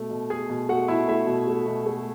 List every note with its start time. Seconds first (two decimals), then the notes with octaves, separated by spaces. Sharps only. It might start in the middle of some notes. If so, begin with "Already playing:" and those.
Already playing: B2 A3
0.10 B2
0.30 A3 G#4 G#5
0.50 B2
0.69 A3 F#4 F#5
0.88 B2 E4 E5
1.08 A3 E4 E5
1.27 B2
1.47 A3
1.67 B2
1.86 A3